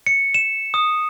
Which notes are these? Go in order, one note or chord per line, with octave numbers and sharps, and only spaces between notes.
C#7
E7
D#6